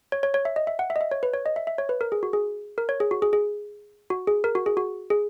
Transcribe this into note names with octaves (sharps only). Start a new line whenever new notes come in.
C#5
C#5
C#5
E5
D#5
E5
F#5
E5
D#5
E5
C#5
B4
C#5
D#5
E5
E5
C#5
B4
A#4
G#4
F#4
G#4
A#4
C#5
G#4
F#4
G#4
G#4
F#4
G#4
A#4
F#4
G#4
F#4
G#4